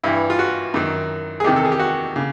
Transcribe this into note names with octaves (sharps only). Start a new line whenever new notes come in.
G2 E3 E4
F4
F#4
F#2 D#3
G#4
E2 C3 D#3 G4
A4
G#4
G4
F#4
C#3